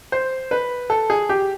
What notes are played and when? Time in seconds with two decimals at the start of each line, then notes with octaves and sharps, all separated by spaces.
0.12 C5
0.51 B4
0.90 A4
1.10 G#4
1.29 G4